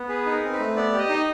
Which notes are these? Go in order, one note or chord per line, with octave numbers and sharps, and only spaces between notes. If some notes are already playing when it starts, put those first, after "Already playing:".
Already playing: B3
G#4 B4
D#4
A#4
C4
B4
A3
B3 D5
G4
D#5
D#4